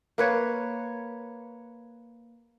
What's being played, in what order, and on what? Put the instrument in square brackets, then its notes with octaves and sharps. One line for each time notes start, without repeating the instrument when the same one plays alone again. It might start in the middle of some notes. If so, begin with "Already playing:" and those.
[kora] A#3 B4 C#5